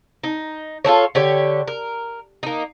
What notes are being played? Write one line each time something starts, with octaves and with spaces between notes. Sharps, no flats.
D#4
F4 G#4 A4 C#5
D3 G4 C#5
A#4
A#3 D#4